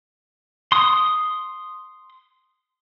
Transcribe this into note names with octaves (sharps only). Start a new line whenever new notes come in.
C6 D#6